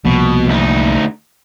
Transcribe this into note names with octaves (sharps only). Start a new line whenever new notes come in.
C2 B2 F3 A#3
D2 D#4